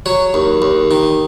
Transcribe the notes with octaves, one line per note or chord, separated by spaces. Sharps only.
F#3 C#5
D#2
D#2
D#3